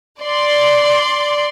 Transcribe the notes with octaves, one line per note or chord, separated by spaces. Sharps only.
D5 C6